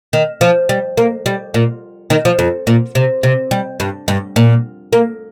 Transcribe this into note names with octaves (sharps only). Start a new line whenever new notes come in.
D#3
F3
G3
A#3
G3
A#2
D#3
F3
F2
A#2
C3
C3
G3
G2
G2
A#2
A#3